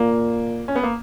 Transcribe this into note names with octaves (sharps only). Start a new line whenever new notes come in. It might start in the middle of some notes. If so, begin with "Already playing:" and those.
Already playing: A#2 A#3
C#4
B3
A#3